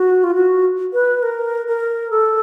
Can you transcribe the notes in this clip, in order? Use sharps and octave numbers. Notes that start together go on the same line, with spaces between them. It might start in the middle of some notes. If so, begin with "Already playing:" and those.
Already playing: F#4
F4
F#4
B4
A#4
A#4
A4